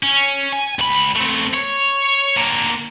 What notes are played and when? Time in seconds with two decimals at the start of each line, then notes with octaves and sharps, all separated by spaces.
0.03 C#4
0.53 G#5
0.79 C#2 B5
1.16 A3 C4
1.54 C#5
2.37 D3 A#3